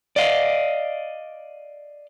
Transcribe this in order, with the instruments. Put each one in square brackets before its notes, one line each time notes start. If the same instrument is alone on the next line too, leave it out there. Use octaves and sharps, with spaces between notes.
[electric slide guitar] D5 D#5 F5